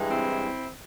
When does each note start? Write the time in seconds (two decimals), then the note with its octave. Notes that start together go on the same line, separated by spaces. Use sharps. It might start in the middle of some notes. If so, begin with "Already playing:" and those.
Already playing: G2 E3 G#3
0.10 C4 E4